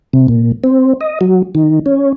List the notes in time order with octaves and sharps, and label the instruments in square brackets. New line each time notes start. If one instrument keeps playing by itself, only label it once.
[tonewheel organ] C3
A#2
C4
D#5
F#3
D#3
C#4